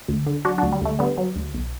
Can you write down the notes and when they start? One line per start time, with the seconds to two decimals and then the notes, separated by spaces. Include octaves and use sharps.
0.08 D2
0.26 D3
0.45 F#3 D4 F#4
0.58 D2 D4 F#4
0.72 G3
0.82 D2 A3
0.99 D3 G3 B3
1.18 F#3
1.36 D2
1.54 B1